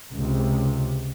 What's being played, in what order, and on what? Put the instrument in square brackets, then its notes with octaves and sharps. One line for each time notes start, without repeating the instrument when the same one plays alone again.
[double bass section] C#2 C3